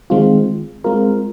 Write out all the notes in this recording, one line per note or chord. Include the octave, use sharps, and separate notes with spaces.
D#3 G#3 C4 F4
G#3 C4 F4 A#4